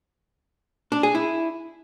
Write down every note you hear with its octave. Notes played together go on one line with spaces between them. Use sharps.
D4
G#4
E4